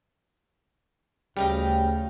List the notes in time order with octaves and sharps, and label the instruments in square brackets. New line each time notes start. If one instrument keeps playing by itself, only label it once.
[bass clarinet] D2 [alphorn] C#3 [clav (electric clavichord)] G3 [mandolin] D#5 F5 G5